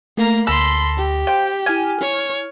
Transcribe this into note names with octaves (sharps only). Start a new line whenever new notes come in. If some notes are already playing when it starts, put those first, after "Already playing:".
A3 A#3 A#5
D2 A4 B5 C6 A#6
G4
C5 F5 G5 C6
E4 G#5 F6
C#5